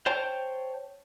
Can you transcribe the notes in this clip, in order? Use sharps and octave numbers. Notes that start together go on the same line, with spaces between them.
C5 C#5 G5 A5